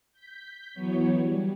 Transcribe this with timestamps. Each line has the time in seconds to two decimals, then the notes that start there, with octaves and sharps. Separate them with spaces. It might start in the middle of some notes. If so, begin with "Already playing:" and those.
0.12 G6 B6
0.74 E3 F#3 B3 C#5
1.20 G3